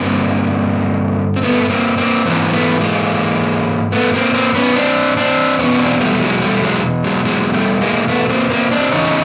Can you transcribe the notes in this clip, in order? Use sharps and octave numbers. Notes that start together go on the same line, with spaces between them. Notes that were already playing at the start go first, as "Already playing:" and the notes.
Already playing: G2 D3 A#3 C4
C4
A3 B3
B3
A#3 C4
A#3 C4
G#2 E3 A#3 C4
C4
A3 B3
G#3 A#3
A3 B3
A#3 C4
A#3 C4
B3 C#4
C4 D4
C4 D4
E2 B2 B3 C#4
C4 D4
G3 A3
F#3 G#3
G3 A3
F#3 G#3
F#3 G#3
F#3 G#3
G3 A3
G#3 A#3
A3 B3
A#3 C4
A#3 C4
C4 D4
E2 C#3 C#4 D#4